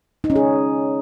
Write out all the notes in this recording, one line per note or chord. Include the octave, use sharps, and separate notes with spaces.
D#4
C#4
G#4